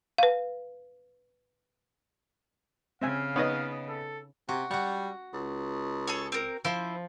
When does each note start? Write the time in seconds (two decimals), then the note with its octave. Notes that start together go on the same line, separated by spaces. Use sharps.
0.18 B4 F5
3.02 C#3 C4 E5 F5 G#5
3.36 B3 D#4 B4 C#5 D#5
3.89 A4
4.49 C3 F#4
4.71 G3 F#4 F#5
5.34 C#2
6.07 G#4 A4 C#5
6.32 C4 A#4
6.65 F3 E4 C5